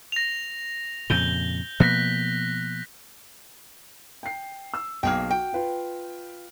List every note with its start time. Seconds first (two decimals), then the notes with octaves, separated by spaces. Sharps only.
0.12 A#6 F7
1.10 F2 A#2 C#3 G6 G7
1.80 B2 F3 A#3 F#6 A#6 B6
4.23 G5 C7
4.74 E6
5.03 B1 A#3 G#4 G5 F6
5.31 F#4 G5
5.53 F4 B4 F5